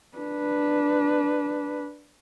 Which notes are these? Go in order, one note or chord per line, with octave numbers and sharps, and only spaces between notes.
D4 B4